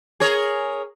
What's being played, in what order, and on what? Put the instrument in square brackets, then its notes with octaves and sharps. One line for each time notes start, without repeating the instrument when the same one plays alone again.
[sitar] G#4 A#4 C#5